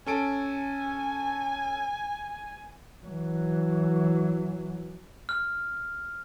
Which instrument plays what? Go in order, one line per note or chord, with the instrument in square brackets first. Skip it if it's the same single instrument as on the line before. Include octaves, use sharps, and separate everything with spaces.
[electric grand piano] C#4 A4 D7 [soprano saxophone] G#5
[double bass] E3 F#3
[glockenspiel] F6